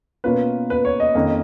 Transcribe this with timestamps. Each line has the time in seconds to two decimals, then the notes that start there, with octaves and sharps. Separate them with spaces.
0.24 B2 A#3 C#4 F4 B4
0.70 B4
0.85 C#5
1.00 D#5
1.15 F2 D#3 A#3 C#4